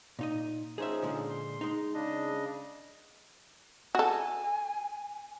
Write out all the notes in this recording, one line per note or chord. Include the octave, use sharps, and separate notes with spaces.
A#2 D#4 D#5
F3 C#4 D#4 G#4 C5 E5
A#2 D3 G#3
C6
G#3 D#4
C#3 D4 D#5
F#4 A4 G#5